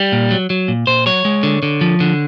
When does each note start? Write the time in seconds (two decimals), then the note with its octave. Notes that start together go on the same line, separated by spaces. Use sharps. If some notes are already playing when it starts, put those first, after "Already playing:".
Already playing: G3
0.12 A#2
0.31 F#3
0.50 F#3
0.68 A#2
0.87 A#2 C5
1.06 F#3 C#5
1.25 G#3
1.43 D3
1.63 D3
1.81 F3
2.00 D3